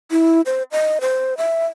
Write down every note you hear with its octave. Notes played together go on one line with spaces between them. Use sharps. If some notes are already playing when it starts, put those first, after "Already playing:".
E4
C5
D#5
C5
E5